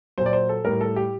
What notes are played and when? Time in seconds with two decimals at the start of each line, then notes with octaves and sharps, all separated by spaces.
0.18 A#2 F#3 C5
0.26 D5
0.33 C5
0.49 A4
0.64 A2 G3 A#4
0.81 A4
0.96 G4